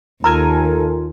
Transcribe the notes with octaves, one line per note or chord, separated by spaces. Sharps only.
D#2 F4 A4 A#4 G#5 A#5